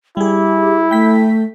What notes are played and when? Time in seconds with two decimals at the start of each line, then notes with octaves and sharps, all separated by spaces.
0.17 G3 E4 G4 G#4
0.91 A3 G5 B6